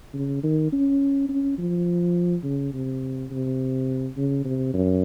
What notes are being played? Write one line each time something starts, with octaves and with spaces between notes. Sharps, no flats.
C#3
D#3
C#4
C#4
F3
C#3
C3
C3
C#3
C3
F#2